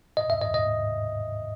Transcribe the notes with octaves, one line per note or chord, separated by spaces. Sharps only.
D#5
E5
D#5
D#5